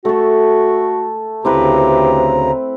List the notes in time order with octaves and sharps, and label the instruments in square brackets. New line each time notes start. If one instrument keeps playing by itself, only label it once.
[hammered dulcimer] A3 A4 [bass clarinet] F#4
[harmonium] D2 C#3 A#5 [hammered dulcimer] C4 E4 B4 [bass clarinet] G4